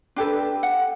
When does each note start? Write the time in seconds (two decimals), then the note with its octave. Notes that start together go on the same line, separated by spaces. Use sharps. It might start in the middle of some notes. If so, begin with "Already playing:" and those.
0.16 D4 G4 A4 B4
0.63 F#5